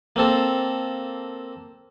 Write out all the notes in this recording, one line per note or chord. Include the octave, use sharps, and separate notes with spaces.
A#3 C4 A4